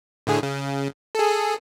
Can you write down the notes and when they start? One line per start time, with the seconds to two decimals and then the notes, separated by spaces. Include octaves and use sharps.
0.27 A2 D3 G#4
0.43 C#3
1.15 G#4 A4